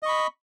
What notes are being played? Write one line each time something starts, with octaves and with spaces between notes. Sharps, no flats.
D#5 B5 C#6